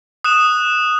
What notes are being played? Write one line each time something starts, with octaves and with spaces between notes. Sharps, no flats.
D#6 F#6 E7 F7